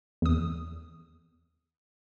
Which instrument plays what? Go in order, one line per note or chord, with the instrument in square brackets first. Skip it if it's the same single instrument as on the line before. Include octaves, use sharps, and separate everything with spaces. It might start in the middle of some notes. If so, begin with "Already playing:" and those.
[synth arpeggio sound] E2 D#6